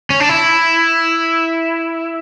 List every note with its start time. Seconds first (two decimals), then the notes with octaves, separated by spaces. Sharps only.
0.10 C#4
0.20 D4
0.29 E4